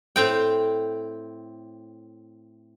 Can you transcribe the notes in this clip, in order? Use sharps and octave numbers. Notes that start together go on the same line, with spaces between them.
A2 C4 G5